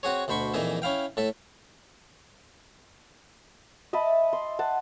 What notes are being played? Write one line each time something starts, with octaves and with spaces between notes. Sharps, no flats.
C4 F#4 G#4 C#5
D2 B2 C5 B5 C#6
F2 A#2 E3 D#4 G#4 E5
C#4 E4 F5 G5
A2 A4 E5
D#5 E5 A5 B5
C6
F#5 A5